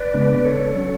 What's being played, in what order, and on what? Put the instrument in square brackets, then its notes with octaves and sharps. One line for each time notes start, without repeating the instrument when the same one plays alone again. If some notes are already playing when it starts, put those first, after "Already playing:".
Already playing: [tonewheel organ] B4 D5
C#3 G#3 B3 D4
A4 C#5
F#3 C#4